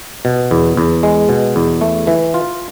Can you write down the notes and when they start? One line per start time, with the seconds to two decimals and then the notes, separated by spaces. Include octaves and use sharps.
0.25 B2
0.51 E2
0.77 E2
1.03 G#3
1.29 B2
1.56 E2
1.81 A3
2.07 E3
2.34 F4